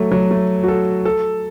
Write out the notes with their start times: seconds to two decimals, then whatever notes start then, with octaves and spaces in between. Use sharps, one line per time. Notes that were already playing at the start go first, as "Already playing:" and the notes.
Already playing: F#3 A3
0.12 F#3
0.31 A3
0.63 F#4
0.68 A4
1.05 A4